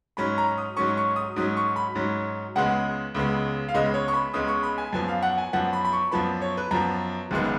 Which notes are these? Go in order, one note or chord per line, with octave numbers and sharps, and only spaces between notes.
G#2 F#3 C#4 B5
A#5
D#6
G#2 F#3 C#4 C#6
C#6
D#6
G#2 F#3 C#4 D#6
C#6
B5
G#2 F#3 C#4
C#2 C#3 G#3 B3 F#5
C#2 C#3 G#3 B3
F5
C#2 C#3 G#3 B3 D#5
C#5
C#6
B5
C#2 C#3 G#3 B3 D#6
C#6
B5
G#5
F#2 F3 B3 G#5
F5
F#5
G#5
F#2 F3 B3 F#5
B5
B5
C#6
F#2 F3 B3 B5
C#5
B4
F#2 F3 B3 A#5
F#1 F#2 D#3 G#3 B3